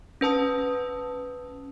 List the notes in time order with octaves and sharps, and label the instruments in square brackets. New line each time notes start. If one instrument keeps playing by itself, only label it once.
[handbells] C#4 B4 A5 D#6